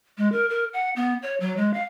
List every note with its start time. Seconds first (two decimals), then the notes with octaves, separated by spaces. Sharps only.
0.18 G#3
0.32 A#4
0.49 A#4
0.73 F#5
0.96 B3
1.22 C#5
1.40 F#3
1.57 G#3
1.74 F5